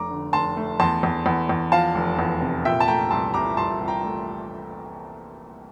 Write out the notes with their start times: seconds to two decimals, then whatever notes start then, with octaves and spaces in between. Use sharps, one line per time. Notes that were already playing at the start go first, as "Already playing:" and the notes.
Already playing: F1 A3 A#5 D6
0.10 D3
0.33 F1 A5 C6
0.57 A3
0.80 E2 A5 C6
1.03 E2
1.26 E2
1.49 E2
1.72 F3 F5 A5
1.95 F1
2.19 E2
2.41 C3
2.65 A#2 E5 G5
2.80 A5
2.88 A3 G5 A#5
3.11 C2 A5 C6
3.34 C2 A#5 D6
3.57 C2 A5 C6
3.81 C2
3.88 G5 A#5
4.04 A3